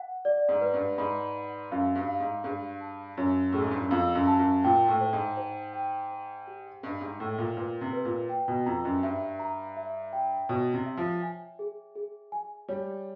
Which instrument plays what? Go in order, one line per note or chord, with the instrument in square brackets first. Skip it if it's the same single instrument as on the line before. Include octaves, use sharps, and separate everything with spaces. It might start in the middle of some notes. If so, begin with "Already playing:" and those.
Already playing: [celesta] F#5
D5
[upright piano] G#2
[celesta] B4
[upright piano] G2
[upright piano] G#2 [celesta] B5
[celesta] F#5
[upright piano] F#2 [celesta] F5
[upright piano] G2
[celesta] F5
[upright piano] G#2
[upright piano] G2 [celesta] G#4
[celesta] A5
[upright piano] F#2 [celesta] C#5
[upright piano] A2 [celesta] G#4
[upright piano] G#2
G2
F#2
[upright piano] F2 [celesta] F5
[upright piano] F#2
[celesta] A5
[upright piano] F#2
[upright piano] A#2 [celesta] G5
[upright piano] A2
[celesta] C5
[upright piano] G#2
[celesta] C5
G5
C5
G4
[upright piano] G2 [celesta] D#5
[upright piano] G#2
[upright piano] A2 [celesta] G5
[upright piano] A#2
[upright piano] A#2 [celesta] B4
[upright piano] C3
[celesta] B4
[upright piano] A#2
[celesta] G5
[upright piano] B2
[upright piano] F2 [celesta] A#5
[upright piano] F#2
[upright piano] G2 [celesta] E5
[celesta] A#5
E5
G5
[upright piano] B2 [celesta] C#5
[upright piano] C3
[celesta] E5
[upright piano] F3
[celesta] G#5
G#4
G#4
G#5
[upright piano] G3 [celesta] C#5